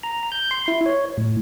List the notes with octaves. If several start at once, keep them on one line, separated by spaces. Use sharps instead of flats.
A#5
G6
C6
E4
C#5
A2